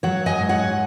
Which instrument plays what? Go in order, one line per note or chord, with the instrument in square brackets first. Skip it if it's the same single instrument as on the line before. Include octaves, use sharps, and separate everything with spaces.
[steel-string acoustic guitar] F#3 C#5 F#5
D#5 G#5
G#2
C#5 F#5